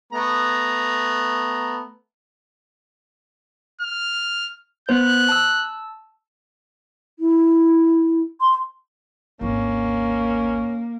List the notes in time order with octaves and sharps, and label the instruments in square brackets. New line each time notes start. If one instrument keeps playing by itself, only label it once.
[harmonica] A3 B3 A#5
[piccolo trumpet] F6
[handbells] B3 C5 [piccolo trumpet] F#6
[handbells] A5 E6
[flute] E4
C6
[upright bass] G#1 D2 [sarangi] A#3 [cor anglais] C#4